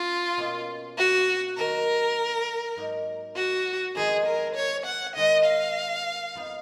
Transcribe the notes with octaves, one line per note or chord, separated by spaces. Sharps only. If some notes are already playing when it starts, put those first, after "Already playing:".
Already playing: C#4 F4
B2 A#3 C#4
F#4
D#3 F#3 A#3 A#4
G#2 F#3 A#3 D#4
F#4
F2 D#3 G#3 B3 D#4 G#4
A#4
C#5
F#5
D#3 G#3 D#4 D#5
F5
F2 F3 B3 D#4